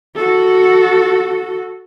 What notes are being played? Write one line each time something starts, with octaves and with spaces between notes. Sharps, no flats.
F#4 A4